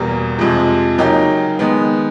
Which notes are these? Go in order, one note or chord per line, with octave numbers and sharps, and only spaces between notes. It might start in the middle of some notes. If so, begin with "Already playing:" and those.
Already playing: E2 B2 G3 A#3
F2 C3 F3 G#3
C#3 F#3 A#3 D#4 G4
D#3 G#3 B3